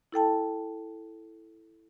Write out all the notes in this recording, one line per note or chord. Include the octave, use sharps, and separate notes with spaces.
E4 A4 G5 A5